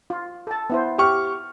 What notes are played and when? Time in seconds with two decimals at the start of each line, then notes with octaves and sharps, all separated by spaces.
0.10 F4
0.47 A4 A5
0.70 B3 E4 C5
0.98 G4 C#6 F6